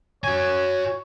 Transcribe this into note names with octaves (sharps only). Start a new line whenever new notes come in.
F#4 C#5 G#5